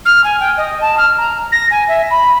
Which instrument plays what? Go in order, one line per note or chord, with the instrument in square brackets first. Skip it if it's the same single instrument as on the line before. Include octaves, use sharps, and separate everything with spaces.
[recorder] F6
G#5
G5
D#5
A5
F6
A#5
A#6
G#5
E5
B5